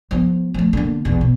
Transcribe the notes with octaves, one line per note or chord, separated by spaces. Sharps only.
F3 B3
F3 A3
D3 A#3
B1 E2
B2